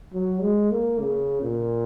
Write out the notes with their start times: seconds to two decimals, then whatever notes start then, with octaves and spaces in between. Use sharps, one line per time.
0.13 F#3
0.42 G#3
0.71 A#3
0.99 C#3
1.42 A#2